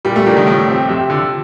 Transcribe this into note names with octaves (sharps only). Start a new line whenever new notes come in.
A#2 G3
A3
F3 G3 A#3 D4
D#3
A2 F3
C4 G4
F2 C3
D3 F3